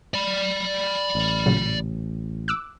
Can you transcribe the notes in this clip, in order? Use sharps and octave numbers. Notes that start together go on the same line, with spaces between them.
D5 B5
A1
A#2 C#3 F#3
D6 E6 F#6